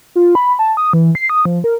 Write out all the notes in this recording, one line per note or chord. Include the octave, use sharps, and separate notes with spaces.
F4
B5
A5
D#6
E3
C7
D#6
F3
A#4